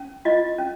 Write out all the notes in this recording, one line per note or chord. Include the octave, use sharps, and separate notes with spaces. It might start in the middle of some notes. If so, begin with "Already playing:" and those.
Already playing: C#4
F4 D#5
C#4